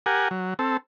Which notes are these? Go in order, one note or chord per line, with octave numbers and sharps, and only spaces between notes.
G4 A#4 F#5 G#5
F#3
C4 A4